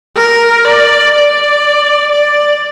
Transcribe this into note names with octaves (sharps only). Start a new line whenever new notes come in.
A#4
D5
D5
D5